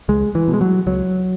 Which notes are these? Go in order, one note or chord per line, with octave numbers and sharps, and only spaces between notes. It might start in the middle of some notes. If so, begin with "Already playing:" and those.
C#2 G#3
E3
B2
G#3
F#3
C#2 F#3